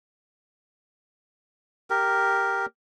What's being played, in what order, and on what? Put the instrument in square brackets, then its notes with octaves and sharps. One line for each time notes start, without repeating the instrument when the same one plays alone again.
[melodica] G4 A#4